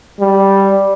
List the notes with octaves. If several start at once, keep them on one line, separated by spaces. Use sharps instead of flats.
G3